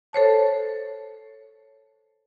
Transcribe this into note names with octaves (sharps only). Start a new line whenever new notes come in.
A4 C5 C#5 A5